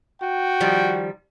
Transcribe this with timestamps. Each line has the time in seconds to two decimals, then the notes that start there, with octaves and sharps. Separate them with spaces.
0.21 F#4 G5
0.60 D#3 F3 G3